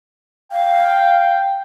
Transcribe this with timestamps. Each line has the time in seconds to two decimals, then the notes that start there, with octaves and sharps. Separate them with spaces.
0.52 F5 G5